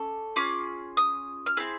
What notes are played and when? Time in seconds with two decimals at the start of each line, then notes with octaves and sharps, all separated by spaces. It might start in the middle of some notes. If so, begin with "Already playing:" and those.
Already playing: C#4 A4 D6
0.36 C#4 F4 G#4 D6
0.97 D#6
1.46 F6
1.57 C4 E4 G#4 E6